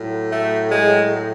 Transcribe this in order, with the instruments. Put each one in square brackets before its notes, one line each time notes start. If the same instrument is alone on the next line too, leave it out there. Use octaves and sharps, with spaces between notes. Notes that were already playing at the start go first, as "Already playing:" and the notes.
Already playing: [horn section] A2 F#3
A3
G#3